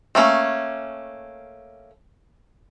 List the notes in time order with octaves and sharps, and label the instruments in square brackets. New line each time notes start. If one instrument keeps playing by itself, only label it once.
[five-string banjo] A3 A#3 C#4